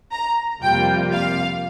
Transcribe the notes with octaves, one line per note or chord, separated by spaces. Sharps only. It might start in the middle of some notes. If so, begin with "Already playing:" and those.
A#5
F2 C3 G3 A#3 F4 G5
F5